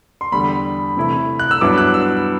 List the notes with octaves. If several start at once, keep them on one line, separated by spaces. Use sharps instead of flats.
C6
E2 D3 G3 B5
C3 E3 A3 E4
F#6
E6
G2 F#3 B3 E4 D6
F#6
E6